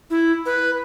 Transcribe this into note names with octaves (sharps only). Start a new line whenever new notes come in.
E4
B4